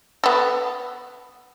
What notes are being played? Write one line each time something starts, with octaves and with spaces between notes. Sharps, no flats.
B3 A4